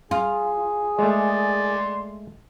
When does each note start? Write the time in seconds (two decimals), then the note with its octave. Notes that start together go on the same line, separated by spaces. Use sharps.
0.11 F4 G#4
0.99 G#3 A3 D5 C6